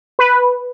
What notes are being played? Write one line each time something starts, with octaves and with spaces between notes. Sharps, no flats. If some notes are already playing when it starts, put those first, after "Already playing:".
B4